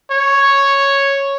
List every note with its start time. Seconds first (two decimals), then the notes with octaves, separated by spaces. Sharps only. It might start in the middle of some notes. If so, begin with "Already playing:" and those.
0.11 C#5